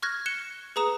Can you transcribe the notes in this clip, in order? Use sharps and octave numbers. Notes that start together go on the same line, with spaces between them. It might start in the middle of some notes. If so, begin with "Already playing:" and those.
C#6 F6 F#6 G#6 A#6
F#6 C#7 E7 G7
G#4 B4 A#5 D#6 E7